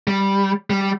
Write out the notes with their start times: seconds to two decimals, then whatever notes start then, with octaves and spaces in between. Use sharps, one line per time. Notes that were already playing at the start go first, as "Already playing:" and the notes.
0.07 G3
0.70 G3